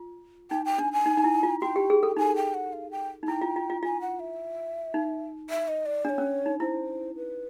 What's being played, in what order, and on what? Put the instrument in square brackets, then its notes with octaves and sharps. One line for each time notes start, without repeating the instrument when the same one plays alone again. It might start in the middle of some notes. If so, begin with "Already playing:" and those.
Already playing: [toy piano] F4
[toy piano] D#4 [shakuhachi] G5
[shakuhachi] G5
[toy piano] D4 [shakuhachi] G#5
[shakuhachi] G#5
[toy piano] D#4
D#4
E4
F4
[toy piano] F#4 [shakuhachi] G5
[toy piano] G4
G#4
A4
[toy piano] D#4 [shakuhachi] G#5
[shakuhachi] G5
F#5
F5
G5
[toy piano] D#4
[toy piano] E4 [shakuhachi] G5
[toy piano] F4
F4
F4
[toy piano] F4 [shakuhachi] G#5
[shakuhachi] F#5
E5
[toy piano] D#4
[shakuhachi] E5
D#5
D5
[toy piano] D4 [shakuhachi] D5
[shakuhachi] C#5
[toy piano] C#4
D#4
[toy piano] E4 [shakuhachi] C5
[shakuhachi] B4